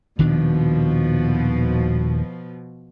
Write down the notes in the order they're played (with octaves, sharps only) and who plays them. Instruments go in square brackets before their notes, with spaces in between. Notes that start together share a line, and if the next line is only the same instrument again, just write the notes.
[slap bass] D#1 D#3 D4 [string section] B2 F3